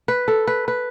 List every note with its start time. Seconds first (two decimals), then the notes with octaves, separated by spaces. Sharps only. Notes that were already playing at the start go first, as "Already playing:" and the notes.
0.08 B4
0.28 A4
0.47 B4
0.68 B4